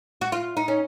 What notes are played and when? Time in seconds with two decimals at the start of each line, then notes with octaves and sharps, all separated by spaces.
0.21 F#4
0.32 F4
0.57 D#4
0.68 C#4